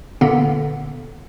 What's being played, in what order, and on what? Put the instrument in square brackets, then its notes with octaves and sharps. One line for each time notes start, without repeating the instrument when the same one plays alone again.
[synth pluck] A#2 D3 A#3 B3